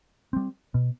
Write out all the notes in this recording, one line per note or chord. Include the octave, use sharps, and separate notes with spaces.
G3 C4
B2